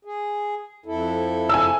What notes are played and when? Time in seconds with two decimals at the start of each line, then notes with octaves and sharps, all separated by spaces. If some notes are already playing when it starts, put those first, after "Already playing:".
0.05 G#4
0.86 F2 E4 A4
1.49 G#5 E6